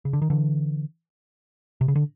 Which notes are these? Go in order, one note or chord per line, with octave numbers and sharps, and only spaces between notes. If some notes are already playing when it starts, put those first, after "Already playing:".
C#3
D3
D#3
D3 E3
C3
C#3
D3